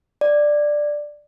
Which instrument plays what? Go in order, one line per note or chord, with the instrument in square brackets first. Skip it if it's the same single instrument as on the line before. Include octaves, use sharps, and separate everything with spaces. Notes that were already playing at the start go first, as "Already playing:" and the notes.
[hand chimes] D5